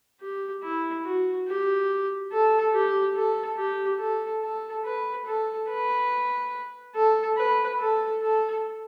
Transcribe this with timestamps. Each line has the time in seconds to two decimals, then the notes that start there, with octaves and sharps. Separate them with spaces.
0.20 G4
0.63 E4
1.05 F#4
1.47 G4
2.32 A4
2.74 G4
3.16 A4
3.58 G4
3.99 A4
4.42 A4
4.85 B4
5.26 A4
5.69 B4
6.95 A4
7.37 B4
7.79 A4
8.21 A4